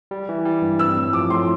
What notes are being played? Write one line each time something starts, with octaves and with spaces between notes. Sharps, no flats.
G3
E3
G3
G2
C4 E6
A2
F3 D6
A2 C6